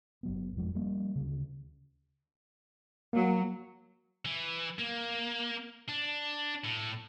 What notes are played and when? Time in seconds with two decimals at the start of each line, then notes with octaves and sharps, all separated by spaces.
0.23 F#1 F#3 B3
0.57 F2 F3 G#3
0.75 F3 G3 A#3 C#4
1.16 D2 C#3
3.13 F#3 A#3
4.25 E3
4.79 A#3
5.89 D4
6.65 A2